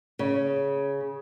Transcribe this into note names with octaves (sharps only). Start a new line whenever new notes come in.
C#3